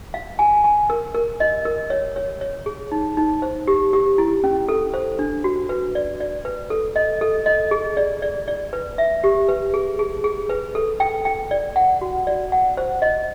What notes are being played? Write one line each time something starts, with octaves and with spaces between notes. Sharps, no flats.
F5
G#5
G#5
A#4
A#4
D#5
A#4
C#5
C#5
C#5
G#4
D#4
D#4
C5
G4
G4
E4
C#4
A4
C5
D4
F#4
B4
D5
D5
B4
A4
D#5
A4
D#5
G#4
D5
D5
D5
B4
E5
G4
B4
G#4
G#4
G#4
B4
A4
G5
G5
D5
F#5
F#4
D5
F#5
C5
D#5